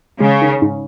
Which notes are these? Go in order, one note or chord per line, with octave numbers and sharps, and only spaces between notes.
C#3 G#3
D#3
G#2